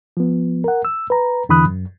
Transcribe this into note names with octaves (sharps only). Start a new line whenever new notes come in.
F3 B3
A#4 F#5
E6
B4 A#5
E2 D3 E3 B5 D#6 F#6
F#2